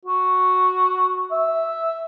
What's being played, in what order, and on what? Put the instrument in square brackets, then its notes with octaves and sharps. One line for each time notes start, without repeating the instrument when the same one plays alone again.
[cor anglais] F#4
E5